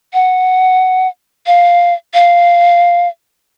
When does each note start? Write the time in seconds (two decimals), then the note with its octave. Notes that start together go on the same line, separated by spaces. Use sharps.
0.13 F#5
1.47 F5
2.14 F5